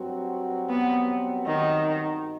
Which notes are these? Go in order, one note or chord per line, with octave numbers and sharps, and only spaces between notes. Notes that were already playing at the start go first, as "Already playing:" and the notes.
Already playing: G2 F#3 C4 F#4
B3
D#3